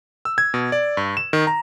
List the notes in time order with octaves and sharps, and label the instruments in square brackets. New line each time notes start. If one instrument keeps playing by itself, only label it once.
[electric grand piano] E6
G#6
B2
D5
G2
E7
D#3
A#5